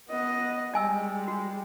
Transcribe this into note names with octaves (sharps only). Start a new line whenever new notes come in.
B3 D#5
G3 G#3 D#5 G#5 E6
F#4